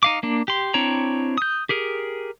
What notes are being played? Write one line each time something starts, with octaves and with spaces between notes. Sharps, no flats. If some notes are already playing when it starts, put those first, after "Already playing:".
D#4 F5 D6
A#3 D4
G4 C6
C4 D4 E4 C#5 A#5
D#6 G6
G4 G#4 A#4